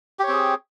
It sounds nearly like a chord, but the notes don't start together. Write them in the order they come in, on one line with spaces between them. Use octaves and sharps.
G4 C#5 C4 G#4